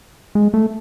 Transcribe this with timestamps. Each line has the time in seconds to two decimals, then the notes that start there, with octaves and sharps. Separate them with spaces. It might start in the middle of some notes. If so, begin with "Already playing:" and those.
0.35 G#3
0.54 A3